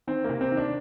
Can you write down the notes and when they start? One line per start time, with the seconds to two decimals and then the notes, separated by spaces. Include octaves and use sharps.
0.07 D#3 C4
0.24 C3 A#3
0.41 C4
0.51 D#3
0.57 D4